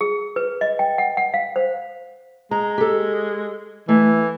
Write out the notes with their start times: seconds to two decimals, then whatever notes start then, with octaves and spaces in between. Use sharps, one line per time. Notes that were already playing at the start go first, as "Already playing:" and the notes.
0.01 G#4
0.36 B4
0.61 D#5
0.79 G5
0.98 F#5
1.17 F#5
1.34 F5
1.56 C5
2.51 G#3 A#5
2.78 G4 A4
3.89 E3 A3